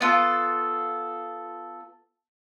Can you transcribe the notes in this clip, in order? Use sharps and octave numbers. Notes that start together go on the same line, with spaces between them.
B3 F4 A4